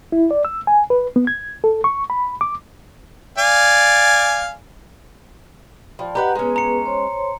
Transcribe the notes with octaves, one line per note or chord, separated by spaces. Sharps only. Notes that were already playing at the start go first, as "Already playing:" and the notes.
E4
D5
E6
G#5
B4
B3
G#6
A4
C#6
B5
D6
D5 F5 G#5
F3 D5 G5 B5
G4 B4 D#5 F#5 A#5
G#3 B3 C#4 G#4 B4
A#5 C#7
C5 C#5 C6